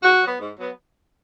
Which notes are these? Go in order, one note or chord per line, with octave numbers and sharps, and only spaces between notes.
G#2 F#4
F#3 B3
G#2
F#3 B3